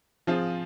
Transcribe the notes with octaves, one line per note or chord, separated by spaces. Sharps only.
F3 C4 F4 G#4